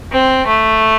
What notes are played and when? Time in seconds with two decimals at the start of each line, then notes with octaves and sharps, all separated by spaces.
0.12 C4
0.48 A3